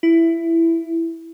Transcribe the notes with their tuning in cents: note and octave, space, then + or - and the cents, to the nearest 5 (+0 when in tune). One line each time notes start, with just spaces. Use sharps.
E4 +10